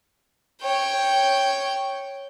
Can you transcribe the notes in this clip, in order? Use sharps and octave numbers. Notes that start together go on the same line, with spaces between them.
C#5 G5